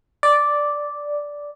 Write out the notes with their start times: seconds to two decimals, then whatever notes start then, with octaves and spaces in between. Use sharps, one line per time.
0.23 D5